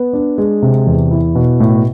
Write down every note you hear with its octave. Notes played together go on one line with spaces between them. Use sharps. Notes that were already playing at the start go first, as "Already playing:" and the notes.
Already playing: B3
D4
G#3
C3
E2
E4
B2
A2